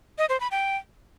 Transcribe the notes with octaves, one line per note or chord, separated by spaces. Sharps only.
D#5
C5
B5
G5